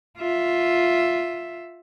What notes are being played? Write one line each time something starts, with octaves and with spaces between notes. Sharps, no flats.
F4 E5